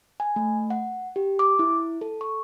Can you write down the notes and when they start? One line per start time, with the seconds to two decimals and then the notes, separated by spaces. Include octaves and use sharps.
0.20 G#5
0.36 A3
0.70 F#5
1.16 G4
1.39 D6
1.59 E4
2.01 A4
2.21 C#6